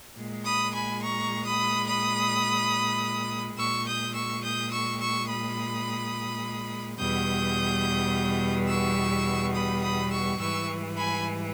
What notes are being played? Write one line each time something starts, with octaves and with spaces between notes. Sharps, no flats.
A#2 G#3
B5 D#6
G#5 B5
A#5 C#6
B5 D#6
B5 D#6
A#2 G#3 C#6 E6
D#6 G6
C#6 E6
D#6 G6
C#6 E6
C#6 E6
B5 D#6
E2 B2 G3 D#6 G6
C#6 E6
B5 D#6
B5 D#6
C#6 E6
G#2 E3 G3 C#6 E6
G#5 B5